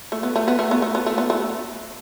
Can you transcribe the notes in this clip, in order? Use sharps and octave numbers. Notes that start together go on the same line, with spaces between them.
A3
B3
A3
B3
A3
B3
A3
B3
A3
B3
A3